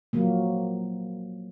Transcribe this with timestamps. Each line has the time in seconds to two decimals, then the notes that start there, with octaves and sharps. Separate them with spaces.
0.13 F3 F#3 A#3